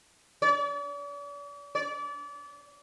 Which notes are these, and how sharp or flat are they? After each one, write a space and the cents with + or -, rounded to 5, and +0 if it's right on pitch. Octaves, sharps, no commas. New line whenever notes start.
D5 -45
D5 -30